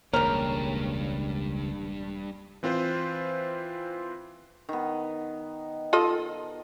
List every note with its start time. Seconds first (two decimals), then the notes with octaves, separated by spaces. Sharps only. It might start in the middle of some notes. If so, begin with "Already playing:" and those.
0.14 E1 C#2 G2 A#3 G4 A#4 C#5
2.63 E3 C4 F4 B4 C5
4.69 D#3 B3
5.93 F4 A4 D#5